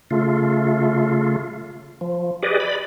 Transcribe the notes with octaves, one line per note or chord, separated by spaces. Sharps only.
C#3 A3 F4
F3
G4 G#4 B4 D5 D#5
D5 B5